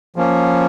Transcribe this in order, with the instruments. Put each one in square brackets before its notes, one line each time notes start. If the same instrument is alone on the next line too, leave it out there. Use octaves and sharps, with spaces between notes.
[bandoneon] F3 A#3 C#4